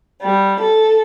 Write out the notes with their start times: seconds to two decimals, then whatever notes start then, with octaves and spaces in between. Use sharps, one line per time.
0.22 G3
0.61 A4